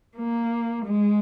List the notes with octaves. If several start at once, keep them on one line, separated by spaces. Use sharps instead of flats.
A#3
G#3